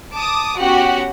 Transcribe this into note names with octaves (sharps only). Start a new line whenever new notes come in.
A5 D6 D#6
B3 C#4 F#4 G4 F#5